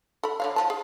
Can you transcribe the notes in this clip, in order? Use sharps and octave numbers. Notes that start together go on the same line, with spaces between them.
A4 B5
D3 C#5 F5
F3 A5
G#4